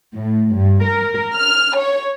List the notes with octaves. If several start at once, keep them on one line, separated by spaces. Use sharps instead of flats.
A2
G2
A#4
F6
C#5